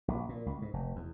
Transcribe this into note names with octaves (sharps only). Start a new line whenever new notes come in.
A#1
A#2
C#2
G#2
F1
E2